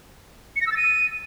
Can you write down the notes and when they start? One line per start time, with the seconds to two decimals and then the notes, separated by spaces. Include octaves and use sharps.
0.56 C#7
0.61 A#6
0.67 E6
0.72 A6
0.77 D#7